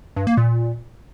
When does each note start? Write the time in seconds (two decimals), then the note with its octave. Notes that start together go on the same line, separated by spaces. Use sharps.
0.16 G2
0.27 A#3
0.37 A#2